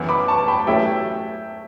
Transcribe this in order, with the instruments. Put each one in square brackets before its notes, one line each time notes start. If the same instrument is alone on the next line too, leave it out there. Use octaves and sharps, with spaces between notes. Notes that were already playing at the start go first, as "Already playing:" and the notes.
Already playing: [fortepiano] F#2 E3 B3
[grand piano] B5 D6
A5 C#6
A5
G5 B5
[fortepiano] F#3 A3 C#4 E4 G4 [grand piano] E5 G5